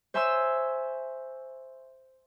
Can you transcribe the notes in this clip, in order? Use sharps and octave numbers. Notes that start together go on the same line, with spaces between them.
C5 E5 G#5 C6 C#6 E6